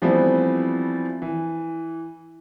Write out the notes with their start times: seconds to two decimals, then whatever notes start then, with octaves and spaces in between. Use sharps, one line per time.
0.02 E3 F3 G3 A3 B3 C4
1.22 E3